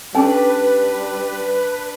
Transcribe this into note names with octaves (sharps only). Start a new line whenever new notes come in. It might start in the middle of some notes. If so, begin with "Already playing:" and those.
G3 C#4 D4 A4 B4 G5 A5